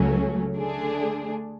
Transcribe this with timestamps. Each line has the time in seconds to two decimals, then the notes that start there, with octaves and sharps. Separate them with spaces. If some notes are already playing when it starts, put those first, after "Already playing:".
Already playing: C#2 C#3 F#3 A3 C#4
0.56 D3 A3 D4 G#4